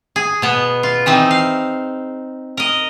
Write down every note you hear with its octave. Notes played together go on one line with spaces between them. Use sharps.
G#4
B2 B3
F4
E3 C4 D#4
F5
A#4 D#5